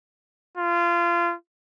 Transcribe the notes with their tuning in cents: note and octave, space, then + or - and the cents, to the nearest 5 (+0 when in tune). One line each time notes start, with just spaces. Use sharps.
F4 -25